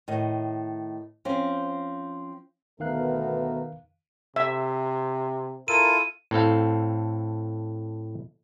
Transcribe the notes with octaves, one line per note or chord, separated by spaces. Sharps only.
A2 D#3 D#5
F3 C4 C#4
D2 B2 D#3 A3 B3 A#4 F5 F#6
C3 E5
E4 F4 A4 A#4 D#7
A2 C4 A4 F5